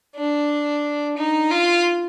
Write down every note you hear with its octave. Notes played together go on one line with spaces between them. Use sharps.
D4
D#4
F4